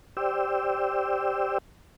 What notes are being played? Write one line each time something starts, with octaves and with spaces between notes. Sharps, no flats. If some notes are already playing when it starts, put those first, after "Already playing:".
G4 C5 D5 G5 E6